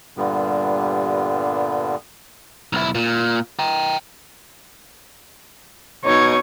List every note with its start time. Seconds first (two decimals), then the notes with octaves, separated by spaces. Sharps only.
0.17 G2 A#2 D3 G3 B3
2.73 B1 E4
2.95 A#2
3.59 G5 A#5
6.05 B2 D#4 C#5 G#6